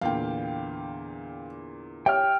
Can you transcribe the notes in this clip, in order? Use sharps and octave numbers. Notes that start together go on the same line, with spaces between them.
E2 A#2 D3 F5 G5
G4 C#5 E5 G5 F6